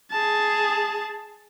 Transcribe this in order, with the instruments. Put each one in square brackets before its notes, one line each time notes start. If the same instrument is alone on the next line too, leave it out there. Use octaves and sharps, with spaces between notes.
[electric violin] G#4 A5